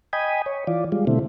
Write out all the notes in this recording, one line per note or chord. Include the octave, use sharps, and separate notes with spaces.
D#5 G5 G#5 B5 D#6
C#5
E3 F4 D5
G3 G#3 F4
B2 D3 A3 C4 E4